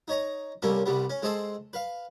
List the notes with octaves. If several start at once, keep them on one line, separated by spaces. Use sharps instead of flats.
D#4 C#5 A#5
C2 G3 A#3 C#4 A4
C2 G3 B3
C#4
G#3 C4 G#4 A4 A5 C6
B4 F5